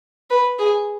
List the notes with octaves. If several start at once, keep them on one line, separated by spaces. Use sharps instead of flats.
B4
G#4